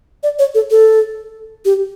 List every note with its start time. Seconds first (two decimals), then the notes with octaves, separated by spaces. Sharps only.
0.23 D5
0.39 C#5
0.55 A4
0.71 A4
1.65 G4